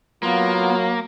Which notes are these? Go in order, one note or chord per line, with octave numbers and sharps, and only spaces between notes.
F#3 A#3 B3 F4